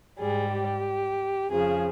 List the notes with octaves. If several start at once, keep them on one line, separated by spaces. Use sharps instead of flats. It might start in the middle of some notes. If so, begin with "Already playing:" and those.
G#2 G3 G#4
G4
F2 C#3 F3 G#4